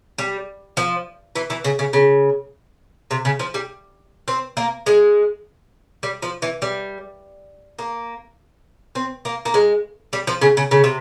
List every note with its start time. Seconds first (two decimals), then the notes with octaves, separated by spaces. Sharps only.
0.18 G3
0.77 F3
1.35 E3
1.50 E3
1.64 C#3
1.79 C#3
1.93 C#3
3.11 C3
3.25 C#3
3.39 F3
3.54 G3
4.28 C4
4.57 A#3
4.86 G#3
6.03 G3
6.22 F3
6.42 E3
6.62 G3
7.79 A#3
8.95 C4
9.25 A#3
9.45 A#3
9.54 G#3
10.13 G3
10.27 F3
10.41 C#3
10.57 C#3
10.71 C#3
10.84 C3